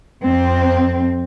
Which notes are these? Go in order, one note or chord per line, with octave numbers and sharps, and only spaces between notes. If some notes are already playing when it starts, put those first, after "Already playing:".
F2 C4